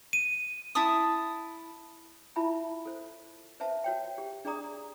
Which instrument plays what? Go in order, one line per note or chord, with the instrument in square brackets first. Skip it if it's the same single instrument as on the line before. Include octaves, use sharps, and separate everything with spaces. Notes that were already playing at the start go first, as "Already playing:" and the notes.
[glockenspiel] D#7
[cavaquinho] E4 A5 D#6
[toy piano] E4 F4 E5 A5 B5
A4 C5
B4 C5 E5 A5
F#4 C#5 G5
G4
D4 G#4 D5 A#5 D#6